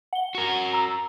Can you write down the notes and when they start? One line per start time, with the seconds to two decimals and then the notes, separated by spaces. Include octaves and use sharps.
0.13 F#5 G7
0.35 F#4 A#4
0.73 A#5 E6